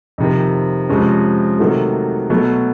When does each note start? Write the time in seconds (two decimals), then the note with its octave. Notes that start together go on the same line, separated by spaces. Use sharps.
0.18 F2 C3 D#3
0.89 F2 C3 F3 G#3 C#4
1.59 C3 D#3 F#3 A3
2.30 B2 F#3 A3